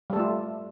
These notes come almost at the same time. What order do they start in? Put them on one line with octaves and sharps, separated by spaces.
G3 A4 A3 F4